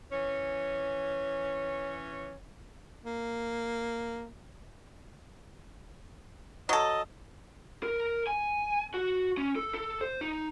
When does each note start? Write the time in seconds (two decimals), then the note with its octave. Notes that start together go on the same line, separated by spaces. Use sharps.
0.11 E3 C#4 C#5
3.04 A#3
6.69 F#3 A4 D#5
7.83 A#4
8.27 G#5
8.94 F#4
9.38 C#4
9.56 A4
9.75 A4
10.01 C5
10.21 D#4